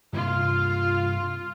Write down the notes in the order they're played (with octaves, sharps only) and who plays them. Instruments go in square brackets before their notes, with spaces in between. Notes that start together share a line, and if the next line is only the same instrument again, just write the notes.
[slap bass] G2 C3 A#3 [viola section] F4